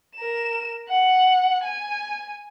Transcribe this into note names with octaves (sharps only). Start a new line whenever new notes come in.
A#4 E7
F#5
G#5